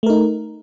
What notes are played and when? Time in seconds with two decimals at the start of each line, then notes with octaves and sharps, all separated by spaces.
0.03 A3
0.06 A#4
0.10 D#4